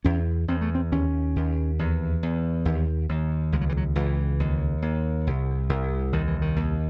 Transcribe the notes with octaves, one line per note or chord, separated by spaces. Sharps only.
E2 C#4
E2 C4
A3
C4
D#2 C#4
D#2
E2
E2
D#2
D#2
C#2 G#3
F#3
E3
F#3
C#2 E3
D#2
D#2
C2
C2
D#2 D#3
E3
D#3
D#2